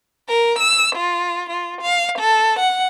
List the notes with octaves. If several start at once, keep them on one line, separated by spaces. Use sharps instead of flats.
A#4
E6
F4
F4
F5
A4
F#5